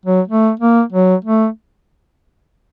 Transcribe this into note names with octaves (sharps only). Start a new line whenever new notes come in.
F#3
A3
A#3
F#3
A3